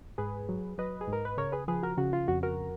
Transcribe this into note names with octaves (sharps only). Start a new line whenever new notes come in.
G#2 G#4 B4
F#3
F#3 B4 D#5
G#4
G#2
A#4
B4
C#3 A#4 C#5
G#4 B4
F3 G#4 B4
F#4 A#4
C#3 F#4
F4
F2 F#4
F#4 A#4